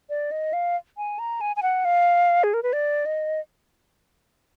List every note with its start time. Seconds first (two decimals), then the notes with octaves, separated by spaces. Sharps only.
0.10 D5
0.31 D#5
0.53 F5
0.97 G#5
1.19 A#5
1.41 G#5
1.56 G#5
1.63 F#5
1.85 F5
2.44 G#4
2.54 A#4
2.63 B4
2.73 D5
3.06 D#5